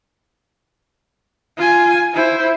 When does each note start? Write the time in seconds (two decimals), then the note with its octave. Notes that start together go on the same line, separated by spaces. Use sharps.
1.58 F4 G#5
2.14 E4 C5